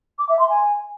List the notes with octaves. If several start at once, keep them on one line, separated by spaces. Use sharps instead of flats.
D6
E5
C6
G#5